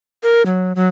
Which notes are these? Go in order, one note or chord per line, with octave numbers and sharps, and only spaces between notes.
A#4
F#3
F#3